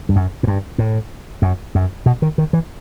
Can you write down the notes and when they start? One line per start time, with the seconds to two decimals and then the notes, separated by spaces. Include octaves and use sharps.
0.09 G2
0.16 F#2
0.43 A2
0.47 G2
0.78 A2
1.42 F#2
1.75 F#2
2.06 B2
2.22 D#3
2.38 D#3
2.53 E3